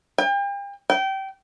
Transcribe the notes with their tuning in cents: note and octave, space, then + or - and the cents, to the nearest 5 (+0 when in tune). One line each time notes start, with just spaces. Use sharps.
G5 +40
G5 -25